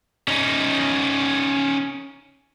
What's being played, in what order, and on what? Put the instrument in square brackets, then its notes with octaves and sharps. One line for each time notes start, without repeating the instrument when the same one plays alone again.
[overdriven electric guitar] C#4 D#4